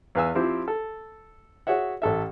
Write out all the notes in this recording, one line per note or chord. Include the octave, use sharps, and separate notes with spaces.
E2 B4 F5 G#5 E6
F3 C4 E4 G4 C5
A4
F#4 G#4 C#5 E5 F#5
A1 A4 E5